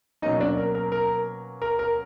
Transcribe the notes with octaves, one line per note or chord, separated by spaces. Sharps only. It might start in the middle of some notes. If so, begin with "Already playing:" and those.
B2 F#3 A#3 C#4 D#4 D#5
D4 D5
A#4
A#4
A#4
A#4
A#4